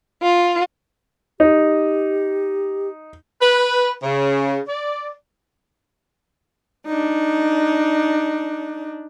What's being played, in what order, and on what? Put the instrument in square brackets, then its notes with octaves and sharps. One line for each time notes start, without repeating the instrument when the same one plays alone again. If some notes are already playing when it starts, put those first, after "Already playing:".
[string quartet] F4
[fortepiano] D#4 [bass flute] G4
[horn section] B4
C#3
D5
[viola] D4 D#4